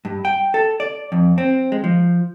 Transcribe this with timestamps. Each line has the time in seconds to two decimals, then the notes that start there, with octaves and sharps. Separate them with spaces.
0.05 G2
0.25 G5
0.54 A4
0.80 D5
1.12 F2
1.38 C4
1.72 G#3
1.84 F3